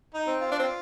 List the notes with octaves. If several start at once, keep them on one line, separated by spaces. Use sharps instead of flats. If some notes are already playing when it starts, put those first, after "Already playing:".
D#4
C4
F4
D4
C4